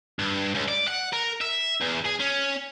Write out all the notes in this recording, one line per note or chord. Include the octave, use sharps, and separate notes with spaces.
G2
C#2
D5
F#5
A#4
E5
E2
G#4
C#4